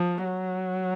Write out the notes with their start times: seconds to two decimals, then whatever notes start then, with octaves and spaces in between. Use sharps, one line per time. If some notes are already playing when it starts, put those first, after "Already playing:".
Already playing: F3
0.24 F#3